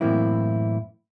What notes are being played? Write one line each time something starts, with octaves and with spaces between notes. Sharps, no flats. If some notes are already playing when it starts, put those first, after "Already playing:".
F#2 A2 E3 A#3 C4 E4